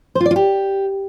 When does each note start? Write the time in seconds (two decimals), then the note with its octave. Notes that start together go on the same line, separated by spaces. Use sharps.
0.15 C5
0.21 F4
0.26 D5
0.31 F4
0.36 G4